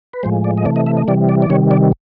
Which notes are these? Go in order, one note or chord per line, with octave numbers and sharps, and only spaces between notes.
B4
A2 F3 G#3 C5
D5
D#5
C3 E3 A3 D5
D#5
E5
D#5
C3 E3 G3 D5
D5
D5
C3 D#3 G3 C#5
D5